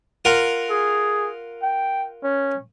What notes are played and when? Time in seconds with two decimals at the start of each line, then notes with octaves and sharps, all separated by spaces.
0.25 F4 A#4 F#5
0.70 G#4
1.62 G5
2.23 C#4